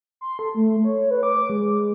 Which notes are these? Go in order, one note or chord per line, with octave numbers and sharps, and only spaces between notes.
C6
A4
A3
C#5
B4
D6
G#3